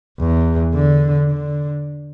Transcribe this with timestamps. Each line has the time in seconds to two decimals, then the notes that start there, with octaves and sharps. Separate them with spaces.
0.19 E2
0.74 D3
1.30 D3